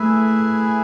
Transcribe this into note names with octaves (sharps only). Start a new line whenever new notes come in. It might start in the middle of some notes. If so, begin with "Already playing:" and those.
Already playing: A3 E4 G#4 B4 E5 G#5